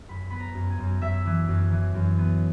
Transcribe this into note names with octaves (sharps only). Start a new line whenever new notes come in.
F#2 B5
B3 B5
A#5
F#2
G#5
F#2
F#2 E5
E3
F#2
E3
F#2
B3